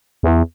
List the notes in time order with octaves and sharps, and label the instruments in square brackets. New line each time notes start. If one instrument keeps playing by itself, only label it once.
[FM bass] E2